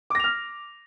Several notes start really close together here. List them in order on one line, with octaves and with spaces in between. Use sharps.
D6 A#6 F7 F6